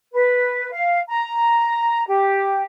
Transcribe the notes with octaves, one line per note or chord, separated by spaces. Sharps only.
B4
F5
A#5
G4